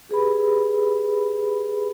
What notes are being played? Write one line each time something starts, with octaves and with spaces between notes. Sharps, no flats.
G4 G#4 B4 B5